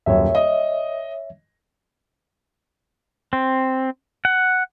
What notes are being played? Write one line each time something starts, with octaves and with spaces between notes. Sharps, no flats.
D#1 F#2 C#5 E5
D#5
C4
F#5